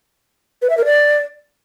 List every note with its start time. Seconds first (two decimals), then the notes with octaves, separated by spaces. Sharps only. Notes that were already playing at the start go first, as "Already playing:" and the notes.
0.62 B4
0.70 E5
0.77 A#4
0.85 D5